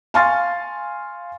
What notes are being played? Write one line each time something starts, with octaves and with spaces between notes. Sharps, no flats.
F5 G#5 C6 C#6 F6 A6